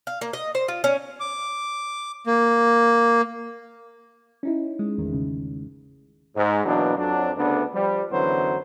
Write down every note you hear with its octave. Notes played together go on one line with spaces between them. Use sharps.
F5
A#3
D#5
C5
F4
C#4
D6
A#3
C#4 D#4 E4
G#3
G#1 E2 A2 D#3 G#3
C#3
G#2
B2 E3 F#3 A#3 D4
F2 F#3 D4
D2 C#3 A3 B3 D4
F3 G3
F#2 D3 E3 F#3 B3 C5